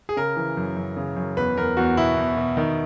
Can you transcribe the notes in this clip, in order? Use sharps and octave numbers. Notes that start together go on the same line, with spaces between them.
G#4
C#3 A#4
E3
F#2
F#2
C#3
F#2
E2 B4
E2 A#4
E2 F#4
B2 E4
E2
B2
D#3